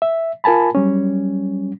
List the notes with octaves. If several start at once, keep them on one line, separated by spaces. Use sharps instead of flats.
E5
F4 A#4 G#5 A5 B5
F#3 G3 C#4